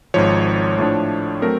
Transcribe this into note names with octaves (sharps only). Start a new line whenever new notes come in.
G#1 G#2 F3 C#5
A2 F3 A3 D4
F#3 A3 C4 A#4